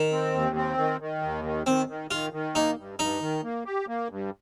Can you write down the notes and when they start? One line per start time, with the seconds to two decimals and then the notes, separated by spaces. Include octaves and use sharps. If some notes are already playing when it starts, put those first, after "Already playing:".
Already playing: D#3
0.11 C4
0.33 D#2
0.56 C4
0.78 D#3
1.00 D#3
1.22 D#2
1.45 D#3
1.66 D#3 C4
1.88 D#3
2.11 D#3 F4
2.33 D#3
2.55 A#3 D#4
2.77 G2
2.99 G2 D#4
3.21 D#3
3.43 A#3
3.65 G4
3.88 A#3
4.10 G2